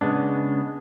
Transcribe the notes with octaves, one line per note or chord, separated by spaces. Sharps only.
C#3 G#3 B3 D4